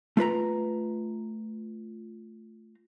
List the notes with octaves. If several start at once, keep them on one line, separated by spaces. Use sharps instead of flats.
A3 F4 B4 A#5